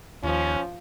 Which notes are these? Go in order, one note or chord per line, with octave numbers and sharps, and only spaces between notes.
D#2 F3 C#4